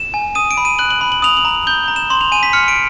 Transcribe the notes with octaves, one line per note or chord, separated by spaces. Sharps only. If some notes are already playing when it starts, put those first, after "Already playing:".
Already playing: E7
G#5
D#6 D#7
D7
B5
D#7
F#6 F#7
F#7
B5
F#7
D#6 F7
F#7
A#5
G6 G7
A#5
E7
C6 F#7
F7
G#5 D#7
B6
F6 C#7
D7